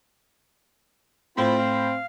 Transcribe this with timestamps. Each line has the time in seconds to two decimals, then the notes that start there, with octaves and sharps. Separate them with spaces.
1.37 A2 C4 F4 C5 B5
1.58 F5